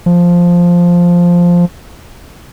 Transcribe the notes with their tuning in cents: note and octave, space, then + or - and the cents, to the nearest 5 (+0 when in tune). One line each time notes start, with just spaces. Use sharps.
F3 +0